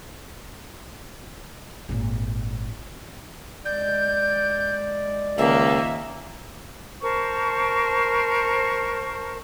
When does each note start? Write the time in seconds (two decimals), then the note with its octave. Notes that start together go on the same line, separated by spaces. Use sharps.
1.89 G#1 A#2
3.65 G#3 D5 G6
5.38 C#2 D#3 A#3 E5
7.01 A#4 C5 A5 C#6